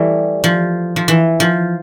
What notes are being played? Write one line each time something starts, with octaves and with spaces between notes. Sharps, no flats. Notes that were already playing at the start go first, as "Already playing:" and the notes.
Already playing: E3 G3 A3
F3
F3
E3
F3